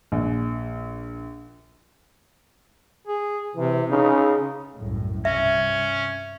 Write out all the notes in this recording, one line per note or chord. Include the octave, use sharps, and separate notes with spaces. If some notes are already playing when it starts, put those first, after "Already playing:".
A#1
G#4
C3 E3
C#3 D#4
C2 F#2 A2
G2 C3 C#4 E5